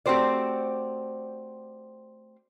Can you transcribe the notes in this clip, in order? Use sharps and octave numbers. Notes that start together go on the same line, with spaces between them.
A3 C4 F#4 G4 C5 D5